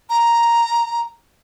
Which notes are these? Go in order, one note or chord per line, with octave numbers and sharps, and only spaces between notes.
A#5